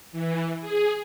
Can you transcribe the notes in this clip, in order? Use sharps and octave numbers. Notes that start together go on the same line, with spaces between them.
E3
G#4